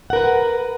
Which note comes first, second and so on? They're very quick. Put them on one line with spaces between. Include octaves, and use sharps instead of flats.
F#5 A#4 B4